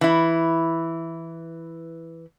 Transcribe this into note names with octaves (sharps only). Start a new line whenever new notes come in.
E3 E4